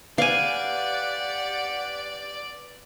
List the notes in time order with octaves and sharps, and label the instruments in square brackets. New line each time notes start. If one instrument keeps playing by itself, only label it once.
[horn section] G4 F#5 [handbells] B4 [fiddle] D5 [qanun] F5 G#5